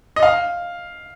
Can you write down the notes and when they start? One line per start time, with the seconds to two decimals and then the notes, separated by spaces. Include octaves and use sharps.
0.16 D#5
0.23 F5